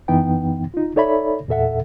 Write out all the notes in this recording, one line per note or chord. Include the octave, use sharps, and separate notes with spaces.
F#2 E3 B3 D#4 G5
D#4 F4
D#4 A4 C#5 D5 E5 B5
E2 A#2 A4 E5 F#5